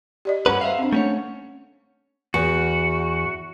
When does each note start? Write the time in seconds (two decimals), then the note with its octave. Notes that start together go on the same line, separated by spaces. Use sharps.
0.25 G4 D5 D#5
0.46 G2 C#4 B4 F#5 A#5
0.61 C5 E5 F5
0.78 C4 D4
0.92 A3 C#4 C#5 F#5
2.34 E2 F#4